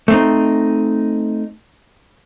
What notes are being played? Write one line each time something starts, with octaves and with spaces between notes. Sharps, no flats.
A3 C4 D#4